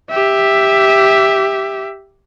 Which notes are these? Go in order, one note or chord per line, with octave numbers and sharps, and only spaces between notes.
G4 E5